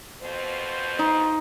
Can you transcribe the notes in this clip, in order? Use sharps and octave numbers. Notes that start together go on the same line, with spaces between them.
F2 B2 C5
D#4